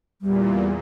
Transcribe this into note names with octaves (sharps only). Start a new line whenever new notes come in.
E2 A#2 G3